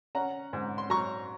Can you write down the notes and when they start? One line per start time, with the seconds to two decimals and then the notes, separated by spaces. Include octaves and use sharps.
0.15 C#4 F#5 A#5
0.53 G#2
0.78 C6
0.90 F#3 A#5 C#6